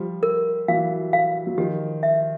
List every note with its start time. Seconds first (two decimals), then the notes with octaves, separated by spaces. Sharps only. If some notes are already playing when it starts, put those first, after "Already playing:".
Already playing: F3 G3
0.23 A#4
0.68 E3 F#3 F5
1.13 F5
1.47 F#3
1.57 D#3 F3 G4
2.03 E5